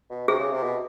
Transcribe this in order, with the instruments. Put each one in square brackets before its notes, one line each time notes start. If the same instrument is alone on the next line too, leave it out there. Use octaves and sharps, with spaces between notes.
[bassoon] B2
[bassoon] C3 [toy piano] G#4
[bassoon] C#3
C3
B2